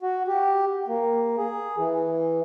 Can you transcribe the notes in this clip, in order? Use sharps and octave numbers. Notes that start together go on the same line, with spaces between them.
F#4
G4
A#3
G#4
E3